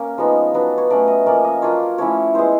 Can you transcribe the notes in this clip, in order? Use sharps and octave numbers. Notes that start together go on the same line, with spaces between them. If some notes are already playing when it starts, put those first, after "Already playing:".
Already playing: A#3 C#4
F3 G#3 B3 D#4
F#3 B3 D4
C#5
F#3 A3 C#4 D5
D#5
F3 A#3 C#4 D5
D#5
F#3 A#3 D4 F4 C#5
F3 A3 C#4 E4 C#5
G#3 B3 E4 C5